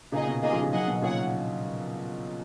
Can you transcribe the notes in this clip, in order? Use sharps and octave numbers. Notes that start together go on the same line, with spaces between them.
A#2 C#3 D#4 G#4 D#5
B2
B2 D#3 A#3 F4 G#4 D#5
C#3 F3
C#3 F3
D#3 F#3 G#4 D#5 F#5
B2 D#3
A#2 C#3 G#4 C#5 F#5